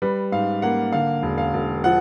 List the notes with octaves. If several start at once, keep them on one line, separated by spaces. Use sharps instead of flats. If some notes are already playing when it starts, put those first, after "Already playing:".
G3 B4
G#2 F5
A#3 F#5
D3 F5
E1
F5
E1
F3 F#5